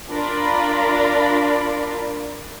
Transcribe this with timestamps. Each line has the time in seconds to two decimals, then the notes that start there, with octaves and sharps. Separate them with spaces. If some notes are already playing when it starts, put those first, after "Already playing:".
0.10 D4 F4 A#4 D5 B5